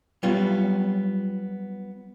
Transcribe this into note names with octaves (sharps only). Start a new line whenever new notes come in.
F#3 G3 B3 C#4 F4